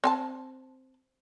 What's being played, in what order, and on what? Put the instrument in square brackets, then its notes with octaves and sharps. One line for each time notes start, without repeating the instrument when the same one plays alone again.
[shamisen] C4 G#5 A5